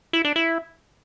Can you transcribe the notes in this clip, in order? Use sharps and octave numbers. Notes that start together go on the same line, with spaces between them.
E4
D4
E4